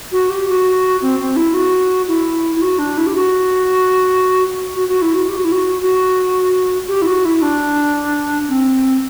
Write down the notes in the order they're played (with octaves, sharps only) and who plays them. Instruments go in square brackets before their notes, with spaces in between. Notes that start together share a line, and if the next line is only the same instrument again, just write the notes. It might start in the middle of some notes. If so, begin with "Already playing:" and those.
[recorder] F#4
G4
F#4
C4
C4
E4
F#4
E4
E4
F#4
D4
E4
G4
F#4
F#4
F#4
E4
F#4
G4
F#4
E4
F#4
F#4
G4
E4
F#4
E4
D4
C4